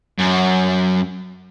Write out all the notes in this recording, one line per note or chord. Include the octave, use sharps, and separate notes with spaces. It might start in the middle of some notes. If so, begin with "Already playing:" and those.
F#2